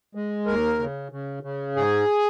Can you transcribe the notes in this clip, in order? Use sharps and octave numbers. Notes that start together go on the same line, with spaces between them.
G#3
D#2 A#4
C#3
C#3
C#3
G#2 G#4